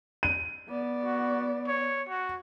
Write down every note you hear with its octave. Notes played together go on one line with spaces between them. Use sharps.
D#7
B3 D5
F#4
C#5
F#4